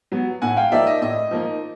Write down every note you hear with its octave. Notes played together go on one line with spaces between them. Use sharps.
F#3 B3
A2 F#5 G#5
F5 G5
F3 A#3 D#4 D5 E5
D#5
A2 D#5
F3 A#3 D#4